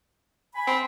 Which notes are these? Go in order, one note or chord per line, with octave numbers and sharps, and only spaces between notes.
G#5 B5
C4